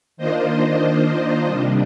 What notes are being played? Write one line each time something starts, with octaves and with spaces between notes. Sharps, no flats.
D#3 A#3 D4 F4 C5 D#5
C3 G3 D4